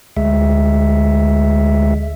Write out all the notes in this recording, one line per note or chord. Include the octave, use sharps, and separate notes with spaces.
D2 G#3 E5